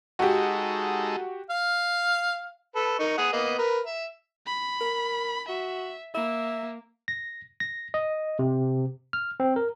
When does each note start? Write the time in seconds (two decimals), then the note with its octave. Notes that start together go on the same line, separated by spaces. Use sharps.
0.19 G#3 D#4 F#4 G4 A4
1.50 F5
2.76 A4 B4
2.99 D#4 A#4 C#6
3.18 G#4 F#5 D#6
3.33 A#3 B3 D#5
3.59 A#4 B4
3.86 E5
4.46 B5
4.81 A#4
5.48 F#4 E5
6.14 A#3 E5
7.08 A#6
7.60 A#6
7.94 D#5
8.39 C3
9.13 F6
9.40 C4
9.56 A#4